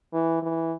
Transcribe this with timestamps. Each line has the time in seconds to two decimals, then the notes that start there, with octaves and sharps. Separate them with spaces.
0.13 E3
0.42 E3